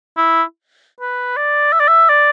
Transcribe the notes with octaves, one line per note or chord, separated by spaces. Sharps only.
E4
B4
D5
E5
D5
E5
D5